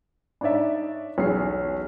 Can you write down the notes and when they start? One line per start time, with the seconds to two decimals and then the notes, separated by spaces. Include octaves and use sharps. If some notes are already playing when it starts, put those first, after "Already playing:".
0.41 D4 D#4 C#5 D5 E5
1.18 B1 E2 C#4 G#4 C#5 C7